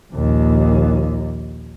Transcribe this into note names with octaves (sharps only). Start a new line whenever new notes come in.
A#1 D#2